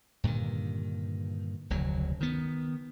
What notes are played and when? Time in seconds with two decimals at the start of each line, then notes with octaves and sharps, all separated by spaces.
0.24 G2 A#2 D3 D#3
1.70 F1 D2 C#3 F#3
2.21 D#3 B3